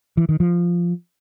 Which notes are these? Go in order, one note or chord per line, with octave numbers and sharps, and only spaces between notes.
E3
D#3
F3